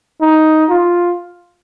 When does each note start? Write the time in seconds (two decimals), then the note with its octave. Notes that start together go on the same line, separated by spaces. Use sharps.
0.21 D#4
0.70 F4